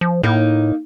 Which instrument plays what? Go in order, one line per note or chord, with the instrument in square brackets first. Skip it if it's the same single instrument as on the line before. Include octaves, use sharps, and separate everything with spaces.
[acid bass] F3
[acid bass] A2 [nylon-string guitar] A#3 D#4